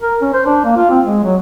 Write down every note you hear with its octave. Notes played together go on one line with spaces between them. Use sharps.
A#4
C#4
C5
D4
A#3
F4
C4
G#3
F#3